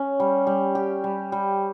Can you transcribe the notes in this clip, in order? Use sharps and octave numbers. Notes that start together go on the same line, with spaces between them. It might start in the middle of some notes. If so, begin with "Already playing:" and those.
Already playing: C#4
G3
G3
G4
G3
G3